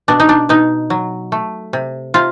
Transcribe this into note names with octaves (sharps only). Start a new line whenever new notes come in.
B2 D4
D#4
D4
B2 D#4
F#3
A3
C3
C3 F4